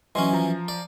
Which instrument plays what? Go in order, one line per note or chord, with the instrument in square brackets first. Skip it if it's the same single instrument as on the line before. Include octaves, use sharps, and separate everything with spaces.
[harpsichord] E3 F#3 C#4 [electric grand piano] D#5 C6
[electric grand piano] F3 A#5
[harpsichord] D5